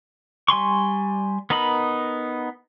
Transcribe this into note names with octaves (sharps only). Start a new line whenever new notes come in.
G3 G#5 C6 C#6
B3 D#4 A#4 D#5 B5